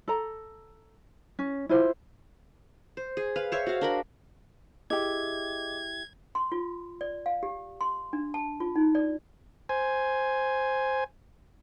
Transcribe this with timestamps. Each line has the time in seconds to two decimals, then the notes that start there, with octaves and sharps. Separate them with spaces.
0.08 A4 A#5
1.39 C#4
1.69 E4 F4 C5
2.97 C5
3.17 G#4
3.36 B4 F5
3.52 C5 C#5 E5
3.67 F#4 F5
3.81 D4 A#4 B5
4.90 E4 G4 G#4 D#5 D6 G#6
6.35 C6
6.52 F4
7.01 D5
7.26 F5
7.43 G4
7.81 C6
8.13 D4
8.34 A5
8.60 F4
8.76 D#4
8.95 D5
9.69 C5 G#5